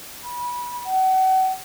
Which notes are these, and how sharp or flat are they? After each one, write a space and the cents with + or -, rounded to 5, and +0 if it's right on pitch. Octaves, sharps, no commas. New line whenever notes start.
B5 -25
F#5 +35